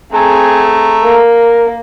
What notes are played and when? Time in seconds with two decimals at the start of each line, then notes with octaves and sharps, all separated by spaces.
0.14 A3 C4 G#4 A4 G#5 A#5
1.03 A#3 A#4